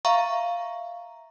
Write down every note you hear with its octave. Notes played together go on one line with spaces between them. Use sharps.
E5 F5 A#5 C#6